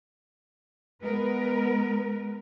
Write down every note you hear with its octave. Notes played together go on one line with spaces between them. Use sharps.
G#3 B3 A#4 B4